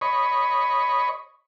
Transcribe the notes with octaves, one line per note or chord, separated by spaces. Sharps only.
C#5 D#5 B5 C#6